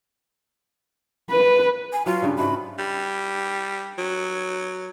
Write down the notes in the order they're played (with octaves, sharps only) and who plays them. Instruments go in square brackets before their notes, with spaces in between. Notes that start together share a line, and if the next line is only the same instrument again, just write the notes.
[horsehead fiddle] B4
[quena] G#5
[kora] F#3 F#4 F5 [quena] F4
[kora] G2 C#3 G3
[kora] G#2 A3 F#4 [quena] B5
[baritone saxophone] G3
F#3